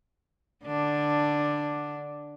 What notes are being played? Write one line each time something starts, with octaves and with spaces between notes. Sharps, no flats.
D3 D4